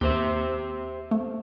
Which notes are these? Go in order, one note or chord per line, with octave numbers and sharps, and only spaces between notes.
D#2 G4 C5 E5
A3